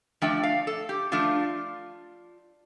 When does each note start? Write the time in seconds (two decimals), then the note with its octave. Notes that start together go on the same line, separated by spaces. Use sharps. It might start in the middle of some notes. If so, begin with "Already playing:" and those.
0.22 F3 A3 D4 G5
0.44 F5
0.67 A4
0.89 G4
1.12 F3 A3 D4 F4